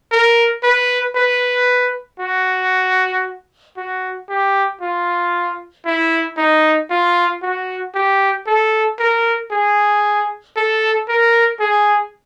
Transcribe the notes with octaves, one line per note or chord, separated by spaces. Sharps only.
A#4
B4
B4
F#4
F#4
G4
F4
E4
D#4
F4
F#4
G4
A4
A#4
G#4
A4
A#4
G#4